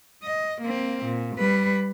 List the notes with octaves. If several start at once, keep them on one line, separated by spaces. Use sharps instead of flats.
D#5
A#3 C4
A#2
G3 B4